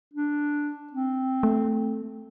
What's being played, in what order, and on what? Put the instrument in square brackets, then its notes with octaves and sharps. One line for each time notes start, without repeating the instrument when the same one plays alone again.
[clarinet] D4
C4
[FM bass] A3